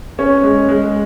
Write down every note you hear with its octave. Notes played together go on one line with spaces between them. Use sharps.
C#4
G#3
G#3